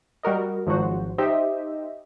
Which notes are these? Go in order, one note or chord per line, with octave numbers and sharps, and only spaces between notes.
G3 F#4 A#4 D#5
G#1 F3 F#3 F#4 C5
D#4 G4 C5 D#5 E5